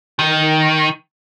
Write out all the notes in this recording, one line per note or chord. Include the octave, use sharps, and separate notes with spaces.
D#3